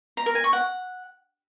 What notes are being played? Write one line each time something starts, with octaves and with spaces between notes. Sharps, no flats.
A#5
A#4
G#5
C#6
F#5